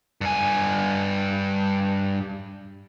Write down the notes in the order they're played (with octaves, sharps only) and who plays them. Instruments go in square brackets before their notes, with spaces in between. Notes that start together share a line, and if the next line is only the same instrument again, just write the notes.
[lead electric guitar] G2 G#5